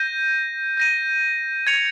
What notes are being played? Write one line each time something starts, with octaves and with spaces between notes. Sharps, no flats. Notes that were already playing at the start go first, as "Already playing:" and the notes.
Already playing: G6 A#6 D#7
G6 A#6 D#7
G#6 C#7 F7